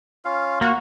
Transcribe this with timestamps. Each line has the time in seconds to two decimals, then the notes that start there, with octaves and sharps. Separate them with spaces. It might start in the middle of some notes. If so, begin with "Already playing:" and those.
0.25 C#4 F4 F5
0.61 A#3 F#4